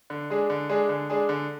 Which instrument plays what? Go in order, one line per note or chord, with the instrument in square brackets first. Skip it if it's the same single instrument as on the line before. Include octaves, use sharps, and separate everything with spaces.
[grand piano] D3
G#3 D4 G#4
D3
G#3 D4 G#4
D3
G#3 D4 G#4
D3